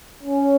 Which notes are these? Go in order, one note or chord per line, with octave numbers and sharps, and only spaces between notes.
C#4